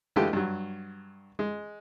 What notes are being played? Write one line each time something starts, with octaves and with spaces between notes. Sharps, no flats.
D3 E3 G#3 A3 F4 G4
G2 F#3
G#3